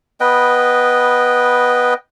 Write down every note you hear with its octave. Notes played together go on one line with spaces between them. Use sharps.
B3 B4 D#5 G5